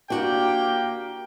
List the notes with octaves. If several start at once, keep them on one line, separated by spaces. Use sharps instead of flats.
A#3 D4 F#4 G4 G5